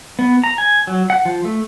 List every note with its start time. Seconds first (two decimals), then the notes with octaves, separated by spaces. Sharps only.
0.19 B3
0.44 A#5
0.58 G#5
0.87 F#3
1.10 F#5
1.25 F3
1.45 A3